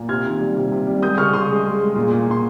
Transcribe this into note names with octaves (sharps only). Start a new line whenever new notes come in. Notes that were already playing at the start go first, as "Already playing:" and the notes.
Already playing: A#2
C3 F6 G#6
D#3
G3
C3
C3
G3
G#3 D#6 G6
C#3 C#6 F6
C#3 C6 D#6
G#3
G#3
G#3
A#2
A#2
A#2 C6